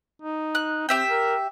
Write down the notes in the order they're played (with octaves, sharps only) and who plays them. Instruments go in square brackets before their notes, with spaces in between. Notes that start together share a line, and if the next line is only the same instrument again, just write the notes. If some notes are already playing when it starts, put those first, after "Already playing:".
[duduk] D#4
[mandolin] F#6
[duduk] C4 [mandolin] G4 E5 G5
[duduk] A#4